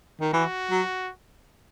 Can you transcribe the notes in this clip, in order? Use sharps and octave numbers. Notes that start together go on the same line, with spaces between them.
D#3
E3 F#4
F#3